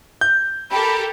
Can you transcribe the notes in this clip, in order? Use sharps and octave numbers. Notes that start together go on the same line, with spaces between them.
G6
G4 A4 A#4 B5